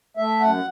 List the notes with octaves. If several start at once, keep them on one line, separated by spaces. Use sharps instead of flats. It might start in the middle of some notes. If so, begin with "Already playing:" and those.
A3 E5
F#2 F#5